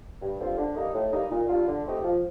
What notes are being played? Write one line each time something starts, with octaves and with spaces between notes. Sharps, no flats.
G2
D3 G3 C4 F4
D3
G3 A#3 D#4
A2
G3 A#3 D#4
A#2
G3 D4 F4
D3
A3 C4 D#4 G4
F3